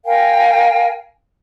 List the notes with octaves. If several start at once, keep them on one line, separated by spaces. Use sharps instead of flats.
A#4 F5 G5 G#5